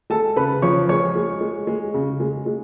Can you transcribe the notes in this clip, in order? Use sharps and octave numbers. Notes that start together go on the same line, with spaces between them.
G#3 A4 A5
C#3 B4 B5
F3 C#5 C#6
G#3 C#5 C#6
G#3
G#3
G#3
C#3
G#3
G#3